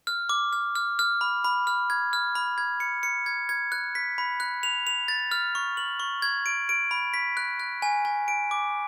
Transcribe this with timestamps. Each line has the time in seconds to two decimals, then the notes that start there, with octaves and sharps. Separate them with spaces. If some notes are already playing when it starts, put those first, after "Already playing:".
0.07 F6
0.29 D6
0.53 F6
0.75 F6
0.99 F6
1.21 B5
1.44 B5
1.67 F6
1.90 G#6
2.13 F6
2.35 B5
2.58 G#6
2.80 C#7
3.03 C#7
3.26 G#6
3.49 G#6
3.72 F#6
3.95 B6
4.18 B5
4.40 F#6
4.63 F7
4.87 F7
5.08 A6
5.31 F6
5.55 C#6
5.77 F#7
6.00 C#6
6.22 G#6
6.46 D7
6.69 D7
6.91 B5
7.14 B6
7.37 F#6
7.60 F#6
7.82 G#5
8.05 G#5
8.28 D7
8.51 D6